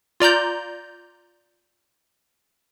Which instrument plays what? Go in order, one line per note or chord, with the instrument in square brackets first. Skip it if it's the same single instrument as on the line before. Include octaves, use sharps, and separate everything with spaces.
[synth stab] F4 D5 A#5 G6